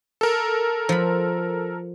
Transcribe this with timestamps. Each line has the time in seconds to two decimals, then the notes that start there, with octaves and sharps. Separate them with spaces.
0.21 A4 A#4
0.89 F3 B5